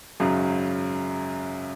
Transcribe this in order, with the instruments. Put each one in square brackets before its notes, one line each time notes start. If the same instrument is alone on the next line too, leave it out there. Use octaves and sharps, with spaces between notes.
[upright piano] G#1 F#2 C#3 F#3